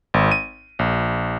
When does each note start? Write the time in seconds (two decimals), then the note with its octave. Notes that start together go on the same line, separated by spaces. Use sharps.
0.14 G#1
0.32 D#7
0.79 A#1